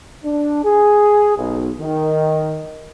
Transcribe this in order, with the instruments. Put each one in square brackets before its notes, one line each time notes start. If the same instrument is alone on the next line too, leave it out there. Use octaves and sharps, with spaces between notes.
[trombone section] D4
G#4
B1
D#3